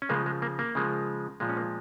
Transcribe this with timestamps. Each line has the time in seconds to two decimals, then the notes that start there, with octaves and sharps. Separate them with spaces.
0.02 C#4
0.09 C#3 F3 G#3 A#3
0.26 G#3
0.42 A#3
0.59 A#3
0.75 C#3 F3 G#3
1.40 A#2 F3 G#3
1.49 C#4
1.57 A#3